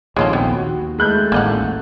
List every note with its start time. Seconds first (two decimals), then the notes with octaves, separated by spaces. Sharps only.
0.16 A#1 D#2 C3 G#3 F4 A4 C#5
0.33 B3 G5
0.55 D#2 F#4
0.98 G#3 A3 F#6 G6
1.32 A1 D#2 A2 A#3 D#5 F#5